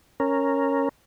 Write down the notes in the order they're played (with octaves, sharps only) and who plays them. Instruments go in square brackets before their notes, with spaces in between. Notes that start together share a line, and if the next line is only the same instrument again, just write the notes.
[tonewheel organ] C#4 A#4